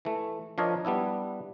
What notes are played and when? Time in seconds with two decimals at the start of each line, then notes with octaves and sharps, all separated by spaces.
0.05 E3 A3
0.58 F3 D4 A#4 C#5 D#5
0.85 G3 B3 D4 E4